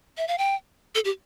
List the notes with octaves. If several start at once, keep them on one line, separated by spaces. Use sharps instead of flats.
E5
F5
G5
A4
G4